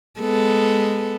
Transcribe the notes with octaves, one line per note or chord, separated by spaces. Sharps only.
G#3 B3 A4